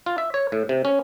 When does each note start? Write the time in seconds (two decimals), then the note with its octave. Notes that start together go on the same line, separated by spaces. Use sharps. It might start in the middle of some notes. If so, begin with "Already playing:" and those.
0.06 F4
0.18 E5
0.34 C#5
0.52 A2
0.69 C3
0.85 C#4